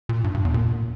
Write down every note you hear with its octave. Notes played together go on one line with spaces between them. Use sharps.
A#2
G2
G2
E2
A#2